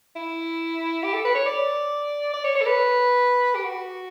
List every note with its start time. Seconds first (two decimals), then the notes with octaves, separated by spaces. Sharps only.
0.16 E4
1.03 G4
1.14 A4
1.25 B4
1.35 C#5
1.46 D5
2.34 D5
2.44 C#5
2.55 C#5
2.61 A4
2.66 B4
3.55 G4
3.64 F#4